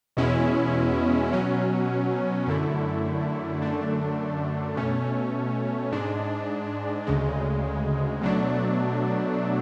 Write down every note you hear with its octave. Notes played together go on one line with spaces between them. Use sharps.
E2 B2 G#3 C#4 E4
B2 F#3 C#4
F#2 D3 A3 E4
F#2 D3 A3 D4
B2 A3 C#4
G#2 G#3 D4
D2 C#3 G#3
B2 F#3 A3 D4